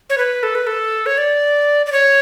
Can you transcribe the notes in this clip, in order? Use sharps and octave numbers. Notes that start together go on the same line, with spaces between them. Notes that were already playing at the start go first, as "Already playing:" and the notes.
C#5
B4
A4
B4
A4
C#5
D5
D5
C#5